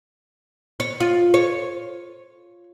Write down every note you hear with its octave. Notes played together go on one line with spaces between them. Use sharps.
C#5
F4
C#5